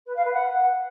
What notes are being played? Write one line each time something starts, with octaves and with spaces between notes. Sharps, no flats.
B4
F5
B4
F#5